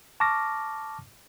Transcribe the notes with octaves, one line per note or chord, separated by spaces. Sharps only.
A5 C#6 D6 F6 A#6